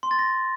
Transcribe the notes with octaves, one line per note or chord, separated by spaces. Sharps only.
C6
A6
A#6